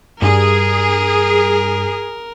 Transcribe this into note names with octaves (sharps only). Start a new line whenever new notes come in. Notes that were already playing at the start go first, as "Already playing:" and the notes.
G2 G#4 A#4